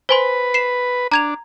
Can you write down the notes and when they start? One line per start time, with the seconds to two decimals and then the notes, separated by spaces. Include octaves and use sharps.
0.09 B4 C5 G#5 C6
0.54 C7 E7
1.12 D4 A#5 G#6 F7